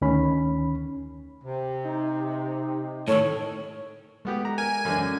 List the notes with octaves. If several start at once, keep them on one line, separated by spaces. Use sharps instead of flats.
D2 D#3 C#4 B5
C3
D#4
A2 D#3 A4 C#5
G#3 A3 B3 G4
A#5
A#4 G#5
F#2 D3 E3 D4
C#4